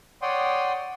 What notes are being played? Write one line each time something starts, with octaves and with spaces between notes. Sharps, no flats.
C#5 D5 F#5 G5 C6 D#6